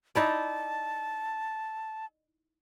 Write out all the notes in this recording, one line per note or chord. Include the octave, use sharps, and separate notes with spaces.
D#4 E4 D5 A5